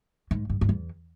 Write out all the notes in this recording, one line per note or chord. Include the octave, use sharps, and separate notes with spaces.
G#2
G2
G2
E2